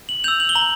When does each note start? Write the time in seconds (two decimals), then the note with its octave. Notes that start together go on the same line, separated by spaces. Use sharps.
0.09 F#7
0.24 E6 G6 F7
0.40 F#7
0.49 G7
0.55 A#5 F#7